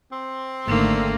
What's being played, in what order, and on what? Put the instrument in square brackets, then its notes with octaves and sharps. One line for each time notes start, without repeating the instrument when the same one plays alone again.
[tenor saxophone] C4
[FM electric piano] G#1 D#3 [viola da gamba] D3 A3 [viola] A#3